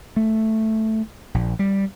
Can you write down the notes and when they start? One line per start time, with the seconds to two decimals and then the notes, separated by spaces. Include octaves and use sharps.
0.16 A3
1.34 A#1
1.59 G3